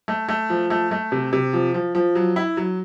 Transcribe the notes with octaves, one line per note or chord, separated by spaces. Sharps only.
A3
A3
F3
A3
A3
C3
C3
F3
F3
F3
F#3
E4
F#3